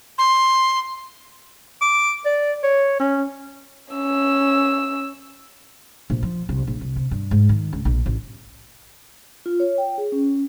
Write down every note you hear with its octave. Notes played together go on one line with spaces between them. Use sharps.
C6
D6
D5
C#5
C#4
C#4 E6
A#1
F3
C2
A#1
C2
C3
G2
G#2
D#3
C#2
A#1
A1
F4
C#5
G5
G#4
C#4